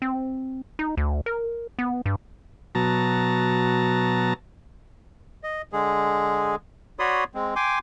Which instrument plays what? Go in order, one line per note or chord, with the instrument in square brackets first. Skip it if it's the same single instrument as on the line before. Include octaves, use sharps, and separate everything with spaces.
[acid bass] C4
D#4
D2
A#4
B3
G2
[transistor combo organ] B2 F#3 A5 A#5
[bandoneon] D#5
D3 G#3 G#4
F#4 C#5 D5 B5 C6 D#6
G#3 C4
G5 G#5 C6 D6